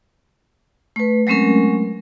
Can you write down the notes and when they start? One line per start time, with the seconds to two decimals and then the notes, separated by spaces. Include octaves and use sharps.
0.96 A3 B4
1.27 F#3 G#3 A3 C4 C#4 A#4